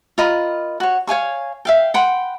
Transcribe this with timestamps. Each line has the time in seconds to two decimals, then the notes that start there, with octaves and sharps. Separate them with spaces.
0.18 F4 A#4 D#5 B5
0.80 F#4 C#5
1.07 C#5 F5 G#5 C#6
1.65 E5 F5 G5
1.94 F#5 G5 B5 C6